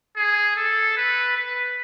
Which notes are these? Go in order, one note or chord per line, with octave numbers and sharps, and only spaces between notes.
G#4
A4
B4
B4